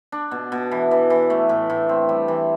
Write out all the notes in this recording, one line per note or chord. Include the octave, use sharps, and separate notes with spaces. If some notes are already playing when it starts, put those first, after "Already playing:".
D4
B2
B2
E3
E3
E3
A3
A2
A2
C4
G3
E3